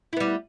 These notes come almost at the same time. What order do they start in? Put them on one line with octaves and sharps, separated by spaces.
E4 B3 G3